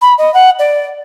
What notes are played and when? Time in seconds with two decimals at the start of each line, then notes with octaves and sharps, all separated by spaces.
0.02 B5
0.18 D#5
0.34 F#5
0.59 D5